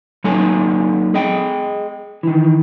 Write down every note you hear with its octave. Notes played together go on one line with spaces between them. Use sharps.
F#3 A#3 D#4 A4 G#5
G#4 D#5 G5
D#3 E3